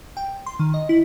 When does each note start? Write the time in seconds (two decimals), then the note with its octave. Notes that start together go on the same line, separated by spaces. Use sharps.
0.17 G5
0.46 C6
0.59 D#3
0.74 D#5
0.89 E4